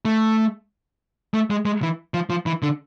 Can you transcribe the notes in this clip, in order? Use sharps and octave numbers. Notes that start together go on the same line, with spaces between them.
A3
A3
G#3
G#3
E3
F3
F3
E3
D3